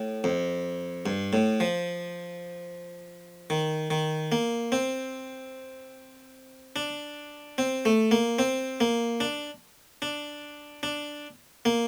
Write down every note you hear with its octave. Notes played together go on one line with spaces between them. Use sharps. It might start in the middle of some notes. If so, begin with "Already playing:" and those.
Already playing: A2
F2
G2
A2
F3
D#3
D#3
A#3
C4
D4
C4
A3
A#3
C4
A#3
D4
D4
D4
A#3